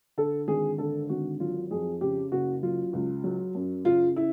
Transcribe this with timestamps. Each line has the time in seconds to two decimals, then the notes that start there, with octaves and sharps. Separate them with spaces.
0.17 D3 A4
0.48 G#1 G#4
0.78 D3 A4
1.09 G#1 F#4
1.40 F#3 F4
1.71 F2 G#4
2.01 C#3 G4
2.32 F#1 F#4
2.63 F#3 F4
2.93 C#2
3.24 F#3
3.55 F#2
3.85 C#3 F4
4.16 E4